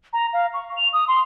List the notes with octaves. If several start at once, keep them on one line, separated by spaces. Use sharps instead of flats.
A#5
F5
C#6
F7
D#6
C6